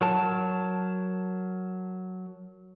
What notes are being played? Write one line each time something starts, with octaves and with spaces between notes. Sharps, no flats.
F#3 A#4 A5